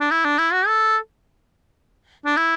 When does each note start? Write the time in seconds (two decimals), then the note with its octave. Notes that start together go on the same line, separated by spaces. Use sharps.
0.01 D4
0.11 E4
0.25 D4
0.39 E4
0.53 F#4
0.67 A4
2.26 D4
2.37 E4